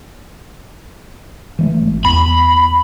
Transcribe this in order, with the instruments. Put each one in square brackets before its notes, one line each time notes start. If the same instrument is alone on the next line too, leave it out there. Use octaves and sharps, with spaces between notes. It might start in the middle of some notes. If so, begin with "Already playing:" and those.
[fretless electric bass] E3 G#3 A3
G#1
[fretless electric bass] E2 [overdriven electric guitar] B5